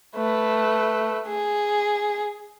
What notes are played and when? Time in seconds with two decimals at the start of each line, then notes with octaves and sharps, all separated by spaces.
0.16 A3 B4
1.28 G#4